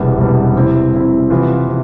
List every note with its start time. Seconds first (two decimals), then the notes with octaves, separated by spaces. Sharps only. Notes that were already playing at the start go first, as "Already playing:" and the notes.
Already playing: E1 E2 C3 G3 B3
0.17 E1 E2 C3 G3 B3
0.55 C3 G3 C4 E4
0.93 C3 G3 C4 E4
1.30 C3 E3 B3 F4
1.68 C3